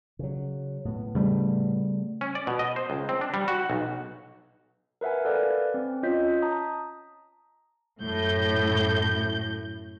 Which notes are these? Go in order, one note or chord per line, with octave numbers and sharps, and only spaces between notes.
C#3 F#3
A2 B3
C#3 G3 A3
C#4
D5
B2
D#5
C5
C#2
C4
D4
G3
F#4
B1
A#4 B4 E5 F#5 G#5
A4 B4 D5 F5 G#5
C4
C#4 F4 C#5 D#5 G6 B6
A5 A#5 D#6
F#2 A2 G6